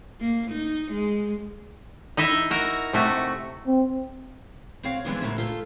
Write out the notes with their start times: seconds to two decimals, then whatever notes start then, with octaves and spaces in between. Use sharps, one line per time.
0.20 A#3
0.51 D#4
0.91 G#3
2.17 D#4 E4 D#5 E5
2.51 F#4 A#4
2.93 C3 A3 F#4
3.66 C4
4.83 C4 F#4 C#5 F5
5.05 E3 F3 G#3 B3 D4 E4
5.21 A2 C#3 A#3 F#4 E5
5.36 A3 F4 A4